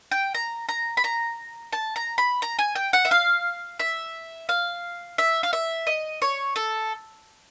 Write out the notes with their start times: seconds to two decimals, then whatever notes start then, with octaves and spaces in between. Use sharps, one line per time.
0.12 G5
0.35 A#5
0.69 A#5
0.97 B5
1.04 A#5
1.72 A5
1.96 A#5
2.18 B5
2.42 A#5
2.59 G#5
2.75 G5
2.93 F#5
3.05 E5
3.11 F5
3.79 E5
4.49 F5
5.18 E5
5.43 F5
5.53 E5
5.87 D#5
6.22 C#5
6.56 A4